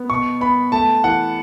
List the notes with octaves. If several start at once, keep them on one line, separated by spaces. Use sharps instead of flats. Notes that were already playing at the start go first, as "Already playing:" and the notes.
Already playing: B3
B2 C#6
B3 B5
A3 A5
E3 F#5